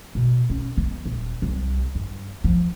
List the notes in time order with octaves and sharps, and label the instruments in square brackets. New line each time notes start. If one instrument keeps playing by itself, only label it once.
[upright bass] B2
C#4
B3
D#1
C2
G2
F3